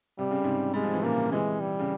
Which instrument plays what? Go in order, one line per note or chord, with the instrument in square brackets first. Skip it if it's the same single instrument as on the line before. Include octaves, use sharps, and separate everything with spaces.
[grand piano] C3 [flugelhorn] G3
[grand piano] C#3
G#2 C3
[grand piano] G3 [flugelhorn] G#3
[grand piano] F3
E3
[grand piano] A#2 C#3 [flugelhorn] A#3
[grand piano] C3 E3 [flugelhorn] G#3
[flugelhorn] G3
[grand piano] C#3